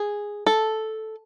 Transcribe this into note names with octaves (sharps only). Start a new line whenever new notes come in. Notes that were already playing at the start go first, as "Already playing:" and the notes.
Already playing: G#4
A4